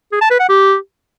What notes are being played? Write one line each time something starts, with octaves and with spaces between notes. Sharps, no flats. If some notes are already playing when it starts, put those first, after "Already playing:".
G#4
A5
B4
F#5
G4